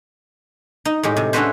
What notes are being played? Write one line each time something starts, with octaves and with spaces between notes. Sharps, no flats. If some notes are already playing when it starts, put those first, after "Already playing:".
D#4
A2 G#3 G4
C3
C#4 D4 E4 F#4 B4 C5